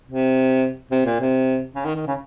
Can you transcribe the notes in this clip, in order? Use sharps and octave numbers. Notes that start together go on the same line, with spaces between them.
C3
C3
A#2
C3
C#3
D#3
D#3
C#3